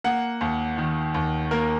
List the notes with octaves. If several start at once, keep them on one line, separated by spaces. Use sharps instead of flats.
A#3 F#5
D#2
D#3
D#2
A#3 A#4